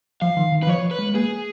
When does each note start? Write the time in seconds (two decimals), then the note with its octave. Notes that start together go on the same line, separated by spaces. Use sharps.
0.21 F3 F5
0.37 D#3
0.52 D#3
0.63 B4
0.67 F3 C#5
0.91 B4
0.99 G#3
1.09 G#3
1.15 A#3 G#4